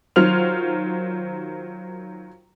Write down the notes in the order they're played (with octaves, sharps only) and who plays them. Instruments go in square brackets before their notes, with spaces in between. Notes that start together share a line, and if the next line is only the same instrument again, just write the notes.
[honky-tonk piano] D#3 F#3 F4 C5 F6 F7